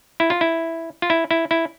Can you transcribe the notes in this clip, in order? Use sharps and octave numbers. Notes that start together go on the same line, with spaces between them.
E4
F4
E4
F4
E4
E4
E4